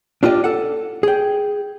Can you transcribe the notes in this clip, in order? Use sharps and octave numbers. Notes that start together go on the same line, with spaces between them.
D4 F4 G4 D#5
A4 F#5
G#4 G5